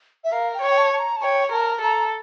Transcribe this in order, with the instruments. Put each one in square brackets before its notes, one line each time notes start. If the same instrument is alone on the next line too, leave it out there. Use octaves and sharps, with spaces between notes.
[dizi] E5
[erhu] A#4 [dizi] F5
[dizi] G5
[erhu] C#5
[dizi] G5
A5
A5
A#5
A5
[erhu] C#5 [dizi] G5
[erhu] A#4 [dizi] A5
[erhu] A4 [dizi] A#5